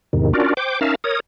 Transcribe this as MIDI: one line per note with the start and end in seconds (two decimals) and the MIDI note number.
0.13 0.33 40
0.13 0.33 44
0.13 0.33 48
0.13 0.33 51
0.34 0.54 61
0.34 0.54 62
0.34 0.54 65
0.34 0.54 66
0.34 0.54 70
0.34 0.54 74
0.57 0.80 72
0.57 0.80 79
0.57 0.80 86
0.81 0.95 61
0.81 0.95 63
0.81 0.95 70
0.81 0.95 76
0.81 0.95 77
0.81 0.95 81
1.04 1.20 70
1.04 1.20 73
1.04 1.20 87